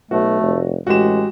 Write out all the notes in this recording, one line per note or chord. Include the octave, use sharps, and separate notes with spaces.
B1 A3 F#4
F1
A1 G#3 F#4 G4 E7